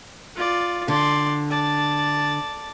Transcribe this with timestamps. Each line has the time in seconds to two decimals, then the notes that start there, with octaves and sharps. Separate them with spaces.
0.36 F4 D5
0.88 D3 D5 C6
1.50 D5 A5